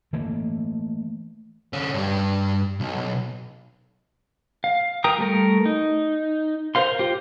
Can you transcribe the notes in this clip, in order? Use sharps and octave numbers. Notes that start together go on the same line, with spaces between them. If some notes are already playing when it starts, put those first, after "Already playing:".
E3 A3 A#3
D3 C#4
G2 G4
B1
F5
A#4 G5 A#5 D#6
G3 A3 A#4
D#4
A#4 C5 F5 C6
F4 G4 C5